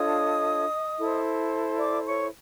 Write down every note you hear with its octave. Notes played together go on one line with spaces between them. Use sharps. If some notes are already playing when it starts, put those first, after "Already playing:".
Already playing: D4 F4 A4 C#5 D#5 D#6
E4 A4 C5
D5 D6
C#5 C#6